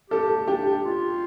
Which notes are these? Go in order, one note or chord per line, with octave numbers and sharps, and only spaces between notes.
G4 A4
D4 G4
F4